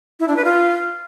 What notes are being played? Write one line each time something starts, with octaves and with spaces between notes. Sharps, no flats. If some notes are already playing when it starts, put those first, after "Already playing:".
E4
D4
B4
F4